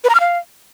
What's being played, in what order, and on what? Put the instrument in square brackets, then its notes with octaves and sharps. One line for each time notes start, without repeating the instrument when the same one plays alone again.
[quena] B4
A#5
F6
F5